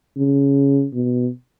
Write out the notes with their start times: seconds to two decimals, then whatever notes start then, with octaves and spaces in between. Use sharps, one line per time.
0.17 C#3
0.94 B2